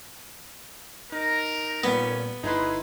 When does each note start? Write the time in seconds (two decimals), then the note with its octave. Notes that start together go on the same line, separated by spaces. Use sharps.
1.12 D#4 A#4
1.84 A#2 G3 B3 C#4
2.43 G1 D#4 E4 G#4 B4 C6